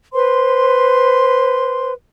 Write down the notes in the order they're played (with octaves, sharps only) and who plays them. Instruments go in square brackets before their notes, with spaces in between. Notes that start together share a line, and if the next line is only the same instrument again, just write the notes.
[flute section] B4 C5 C6